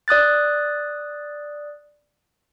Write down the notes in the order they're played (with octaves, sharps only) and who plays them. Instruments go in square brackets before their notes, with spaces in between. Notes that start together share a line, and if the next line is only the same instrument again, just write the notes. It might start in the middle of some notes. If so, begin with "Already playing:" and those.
[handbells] D5 D#6 F#6 A6